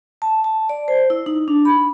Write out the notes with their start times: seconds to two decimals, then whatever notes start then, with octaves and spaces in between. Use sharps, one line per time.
0.22 A5
0.44 A5
0.69 D5
0.88 C5
1.10 E4
1.26 D#4
1.48 D4
1.65 B5